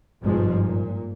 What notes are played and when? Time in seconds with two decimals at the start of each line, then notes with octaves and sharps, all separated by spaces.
0.23 G1 G#2 B2 F3 G3 G#3
0.61 A#2